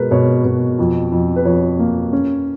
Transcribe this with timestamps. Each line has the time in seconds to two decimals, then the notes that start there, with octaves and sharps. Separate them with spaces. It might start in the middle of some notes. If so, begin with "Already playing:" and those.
Already playing: B2 G#3 A#4 B4
0.11 B2 C#5
0.44 B2
0.79 F2
1.12 F2
1.36 B4
1.45 F2 C#5
1.79 A#3
2.13 C#4